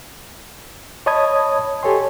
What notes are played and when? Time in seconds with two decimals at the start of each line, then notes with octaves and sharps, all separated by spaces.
1.06 C#5 D#5 A5 B5 D#6 G#6
1.83 G4 A4 C#5 G#5 C6